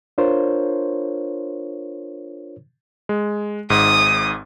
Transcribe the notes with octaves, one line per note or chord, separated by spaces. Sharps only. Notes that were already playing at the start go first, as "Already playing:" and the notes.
D4 F4 A#4 C5 C#5
G#3
G#1 G#2 D#6